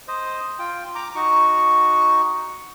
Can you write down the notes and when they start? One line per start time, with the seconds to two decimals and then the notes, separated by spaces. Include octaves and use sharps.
0.08 C5 D#5
0.59 F4 G5
0.95 A#5 D6
1.15 D#4 F#4 C#6